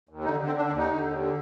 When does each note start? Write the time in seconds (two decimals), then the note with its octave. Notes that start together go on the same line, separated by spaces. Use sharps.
0.09 D#2
0.24 D3 D#4
0.40 D3
0.46 C4
0.56 D3 D4
0.67 D4
0.72 D#2
0.78 D#4
0.88 D3
1.04 D#2
1.18 D3